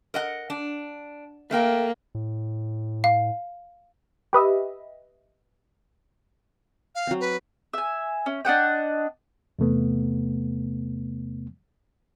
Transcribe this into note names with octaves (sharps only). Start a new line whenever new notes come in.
A#4 D#5 F#5
D4
A3 A#3 A#4 G5
A2
F5
G4 B4 D#5 E5
F5
F#3 C4
B4
E5 G#5
C#4
D4 D#5 F#5 G5
E2 C3 A3 B3